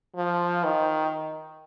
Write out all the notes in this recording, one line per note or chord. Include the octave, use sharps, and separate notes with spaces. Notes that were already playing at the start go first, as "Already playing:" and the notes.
F3
D#3